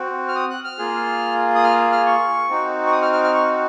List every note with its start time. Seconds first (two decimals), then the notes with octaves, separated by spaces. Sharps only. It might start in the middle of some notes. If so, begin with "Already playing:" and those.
Already playing: C4 F#4
0.28 F6
0.35 D#6
0.50 F#6
0.64 F6
0.79 A#3 F4 G#4
1.55 D#6
1.64 F6
1.92 F6
2.06 C#6
2.49 C4 D#4 F#4
2.86 C#6
2.92 D#6
3.02 F6
3.13 F6
3.24 F6
3.34 C#6